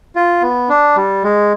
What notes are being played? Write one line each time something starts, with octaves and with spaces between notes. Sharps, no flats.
F4
B3
D4
G3
G#3